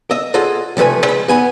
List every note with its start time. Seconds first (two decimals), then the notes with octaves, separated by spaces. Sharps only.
0.11 D#5 E5
0.34 F4 G#4 A4 D#5 F#5
0.77 C2 F3 A3 B4 G#5
1.04 G#3 B5
1.28 B3 G#5 B5